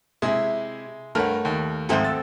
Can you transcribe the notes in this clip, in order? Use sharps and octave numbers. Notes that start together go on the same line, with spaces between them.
C3 G#3 E4 G#4 E5
G2 A3 A#4 C#5 F#5 F6
D#2
G#2 F3 C4 A4 C5 E5 F#5 G#5
E6 A6